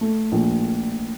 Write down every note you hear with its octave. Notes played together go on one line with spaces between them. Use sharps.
A3
A#1